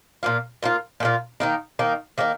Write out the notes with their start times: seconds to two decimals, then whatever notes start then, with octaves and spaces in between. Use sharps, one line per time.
0.23 A#2 A#3 F4
0.63 A#2 A#3 F4
1.00 A#2 A#3 F4
1.40 D#3 A#3 D#4
1.79 D#3 A#3 D#4
2.18 D#3 A#3 D#4